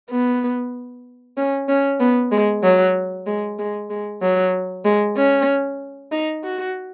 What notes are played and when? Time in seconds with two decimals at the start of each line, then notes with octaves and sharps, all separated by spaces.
0.10 B3
1.37 C#4
1.68 C#4
2.00 B3
2.32 G#3
2.64 F#3
3.27 G#3
3.59 G#3
3.90 G#3
4.22 F#3
4.85 G#3
5.17 C#4
6.12 D#4
6.44 F#4